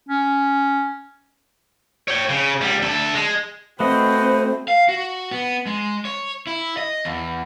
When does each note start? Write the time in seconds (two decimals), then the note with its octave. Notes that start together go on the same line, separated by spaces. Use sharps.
0.09 C#4
2.08 C#5 G5
2.29 C#3
2.61 C#2 G3
2.82 D2 A4
3.15 G#3
3.80 A3 C4 F#4 B4 C5 D#5
4.68 F5
4.89 F#4
5.31 B3
5.66 G#3
6.05 C#5
6.47 E4
6.77 D#5
7.05 E2